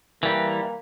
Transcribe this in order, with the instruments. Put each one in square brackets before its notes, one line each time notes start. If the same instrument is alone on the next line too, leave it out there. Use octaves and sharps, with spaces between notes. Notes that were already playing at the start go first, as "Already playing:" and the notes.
[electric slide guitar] E3 G3 [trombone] A#3